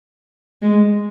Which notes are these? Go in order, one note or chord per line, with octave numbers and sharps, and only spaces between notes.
G#3